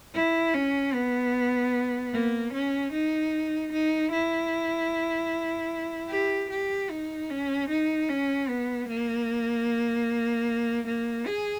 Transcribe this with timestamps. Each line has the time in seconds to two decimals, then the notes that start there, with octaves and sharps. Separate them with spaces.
0.15 E4
0.54 C#4
0.94 B3
2.13 A#3
2.53 C#4
2.93 D#4
3.72 D#4
4.12 E4
6.10 G4
6.50 G4
6.90 D#4
7.30 C#4
7.69 D#4
8.09 C#4
8.49 B3
8.88 A#3
10.87 A#3
11.27 G#4